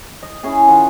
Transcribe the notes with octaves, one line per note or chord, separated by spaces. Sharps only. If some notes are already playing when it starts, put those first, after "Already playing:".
D#5
C#4 E4 G#4
D#3 F4 F#5